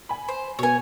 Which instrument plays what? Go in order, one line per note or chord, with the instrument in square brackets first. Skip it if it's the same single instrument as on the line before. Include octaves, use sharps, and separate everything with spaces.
[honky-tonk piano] G#5 B5
[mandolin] C5
[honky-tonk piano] B2 B3 [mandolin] C#5 G#5